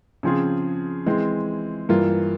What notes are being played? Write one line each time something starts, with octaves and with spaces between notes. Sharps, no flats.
C#3 F3 C4 F4 G#4
E3 G#3 C4
G2 E3 A#3 F4